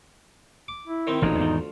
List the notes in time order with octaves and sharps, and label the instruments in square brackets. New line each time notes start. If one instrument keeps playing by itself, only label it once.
[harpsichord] D6
[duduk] E4
[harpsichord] D#3 C4 D#4
[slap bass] A1 A#2 E3 [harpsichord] D2 F3 [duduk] D#4
[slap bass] E2 G#2 D#3